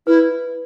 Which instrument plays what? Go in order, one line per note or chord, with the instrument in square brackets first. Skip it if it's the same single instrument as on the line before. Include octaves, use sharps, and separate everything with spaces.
[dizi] E4 [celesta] B4